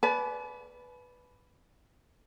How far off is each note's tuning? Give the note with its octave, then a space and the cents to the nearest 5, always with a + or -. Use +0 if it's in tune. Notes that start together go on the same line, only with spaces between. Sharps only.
B4 +0 D5 -15 G#5 +45